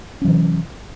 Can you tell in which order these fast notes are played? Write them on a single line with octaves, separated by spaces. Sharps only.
C#4 F#3 E3 C3